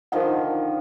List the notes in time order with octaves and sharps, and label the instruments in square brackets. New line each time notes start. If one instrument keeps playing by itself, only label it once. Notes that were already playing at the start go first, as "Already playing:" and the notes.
[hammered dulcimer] D3 D#3 F3 [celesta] A#4 F#5